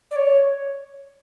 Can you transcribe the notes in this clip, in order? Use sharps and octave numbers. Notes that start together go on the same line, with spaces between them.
D5
C#5